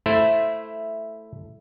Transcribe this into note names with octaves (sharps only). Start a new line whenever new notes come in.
A3 E4 C5